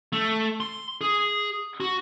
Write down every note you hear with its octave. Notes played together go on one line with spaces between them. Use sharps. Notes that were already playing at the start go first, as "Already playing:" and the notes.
A3
C6
G#4
F#4